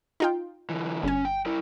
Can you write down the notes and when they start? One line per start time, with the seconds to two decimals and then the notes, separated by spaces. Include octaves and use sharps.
0.20 D#4 F4 G5
0.69 D3 E3
1.03 G1 C#4 G#5
1.25 G5
1.46 E4 A#4